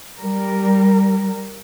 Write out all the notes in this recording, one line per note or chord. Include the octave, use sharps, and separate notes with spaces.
G3 A#4